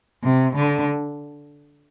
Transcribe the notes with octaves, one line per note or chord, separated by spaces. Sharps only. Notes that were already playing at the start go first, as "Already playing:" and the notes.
C3
D3